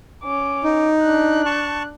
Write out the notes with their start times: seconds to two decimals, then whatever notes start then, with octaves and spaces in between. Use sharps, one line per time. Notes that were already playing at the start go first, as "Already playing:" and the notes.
0.23 C#4 D6
0.64 D#4
1.02 D4 F#6
1.46 A5 C#6